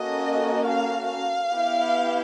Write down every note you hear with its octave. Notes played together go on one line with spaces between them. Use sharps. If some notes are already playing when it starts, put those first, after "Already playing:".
Already playing: A#3 C#4 F#4 A4 D#5
F5
F5
B3 E4 G4